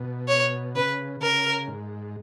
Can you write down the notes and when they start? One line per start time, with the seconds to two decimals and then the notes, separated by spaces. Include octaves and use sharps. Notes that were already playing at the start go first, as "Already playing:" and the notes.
Already playing: B2
0.28 C#5
0.75 C#3 B4
1.21 C#3 A#4
1.68 G#2